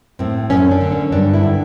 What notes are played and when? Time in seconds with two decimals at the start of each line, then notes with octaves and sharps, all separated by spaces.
0.19 A2 C4
0.50 F#2 C#4
0.71 D4
0.81 D3
0.92 C#4
1.12 G2 D4
1.34 E4
1.43 D3